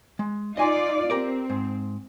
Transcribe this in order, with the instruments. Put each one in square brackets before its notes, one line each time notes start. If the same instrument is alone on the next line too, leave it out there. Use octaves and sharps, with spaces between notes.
[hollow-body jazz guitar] G#3
[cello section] D#4 F4 D5 [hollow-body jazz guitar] D#5 G#5 C6
[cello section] C4 [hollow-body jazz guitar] G4 A#4 D5
[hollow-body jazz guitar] G#2